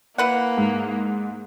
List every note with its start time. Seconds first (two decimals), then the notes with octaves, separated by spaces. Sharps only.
0.18 A#3 E4 B4 F#5
0.58 G#2